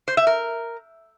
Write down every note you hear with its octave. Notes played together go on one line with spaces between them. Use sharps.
C5
E5
A#4